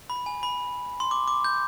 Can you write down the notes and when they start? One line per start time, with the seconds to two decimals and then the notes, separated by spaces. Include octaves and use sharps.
0.10 B5
0.26 G#5
0.43 B5
1.00 C6
1.11 D6
1.28 D6
1.44 G6